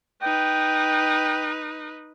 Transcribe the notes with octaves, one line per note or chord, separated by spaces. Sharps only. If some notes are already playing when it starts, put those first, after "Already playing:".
D#4 B4 G5